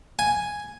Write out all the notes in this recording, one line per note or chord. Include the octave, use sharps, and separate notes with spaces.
G#5